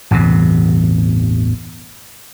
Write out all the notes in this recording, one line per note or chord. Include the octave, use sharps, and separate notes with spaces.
A1 E2 G2 C3